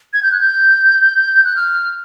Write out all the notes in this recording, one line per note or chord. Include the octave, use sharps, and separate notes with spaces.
G#6
G6
F#6
G6
F#6
F6